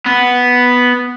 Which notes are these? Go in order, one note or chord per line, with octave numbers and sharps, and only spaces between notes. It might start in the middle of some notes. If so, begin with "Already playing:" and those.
B3